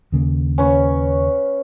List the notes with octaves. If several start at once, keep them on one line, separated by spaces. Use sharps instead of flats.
D#2 C#3 A#3
C#4 B4 C#5